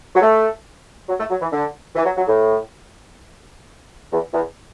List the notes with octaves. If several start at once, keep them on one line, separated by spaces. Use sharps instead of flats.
F#3
A3
F#3
A3
F#3
E3
D3
E3
F#3
F#3
A2
E2
E2